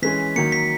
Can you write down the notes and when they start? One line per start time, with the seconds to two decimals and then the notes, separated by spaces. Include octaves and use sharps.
0.02 E3 G#3 C#4 B6
0.36 D#3 F#3 A#3 C#7
0.52 B6